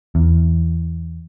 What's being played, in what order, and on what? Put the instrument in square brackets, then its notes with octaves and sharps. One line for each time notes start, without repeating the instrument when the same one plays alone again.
[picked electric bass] E2